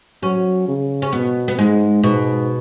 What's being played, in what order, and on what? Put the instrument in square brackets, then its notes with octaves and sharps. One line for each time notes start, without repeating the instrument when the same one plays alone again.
[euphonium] F#3 [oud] C#4
[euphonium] C#3
[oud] C#4
[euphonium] B2 [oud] B3
[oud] B3
[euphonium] G#2 [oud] G#3
[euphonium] G#2 [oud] B2